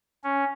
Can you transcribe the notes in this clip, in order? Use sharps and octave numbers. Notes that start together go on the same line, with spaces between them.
C#4